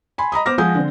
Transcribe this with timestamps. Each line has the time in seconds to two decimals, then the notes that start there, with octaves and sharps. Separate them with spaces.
0.18 G#5 B5 C6
0.32 D#5 A#5 B5 D#6
0.46 B3 C5 D6 F6 A#6
0.58 F3 G#3 F#5 G#5 D#6 G6
0.75 D3 C4